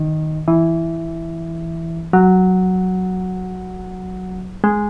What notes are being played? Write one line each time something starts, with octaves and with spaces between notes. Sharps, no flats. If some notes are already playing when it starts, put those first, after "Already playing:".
Already playing: D#3
E3
F#3
G#3